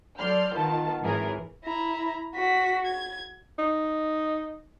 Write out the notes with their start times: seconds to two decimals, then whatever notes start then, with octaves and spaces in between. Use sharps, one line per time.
0.18 F#3 A4 D5 C6 F6 G6
0.54 D#3 B3 F4 A#4 A5
1.02 G#1 E3 G#4 A#4 C#5
1.65 E4 A#5
2.35 F#4 B6
2.86 G#6
3.59 D#4